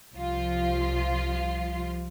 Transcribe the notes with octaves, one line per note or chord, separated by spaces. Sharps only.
C2 F3 F4